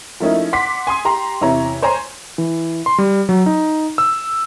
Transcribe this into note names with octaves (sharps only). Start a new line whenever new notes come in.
F3 A3 A#3 C#4 D#4 E4
F#5 C6 D6 B6
G#5 C6 D#6
G4 A#5 C6
E2 C3 E4 C#5 A#5
C5 C#5 G#5 A#5 C6
E3
C6
G3
F#3
D#4
E6